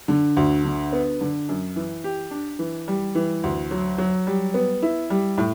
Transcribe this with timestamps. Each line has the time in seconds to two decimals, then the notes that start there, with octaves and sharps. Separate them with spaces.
0.08 D3
0.37 D2
0.64 D3
0.92 B3
1.21 D3
1.49 F#2
1.76 E3
2.04 G4
2.31 D4
2.59 E3
2.88 G3
3.15 E3
3.44 D2
3.71 F#3
3.98 F#3
4.27 G3
4.54 B3
4.82 E4
5.10 G3
5.38 A2